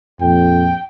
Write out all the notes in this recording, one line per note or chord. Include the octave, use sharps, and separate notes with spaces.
A#1 F2 G5